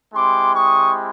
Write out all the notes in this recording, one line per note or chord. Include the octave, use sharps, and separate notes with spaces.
G#3 C4 E4 G4 C6 D6
C#6 D#6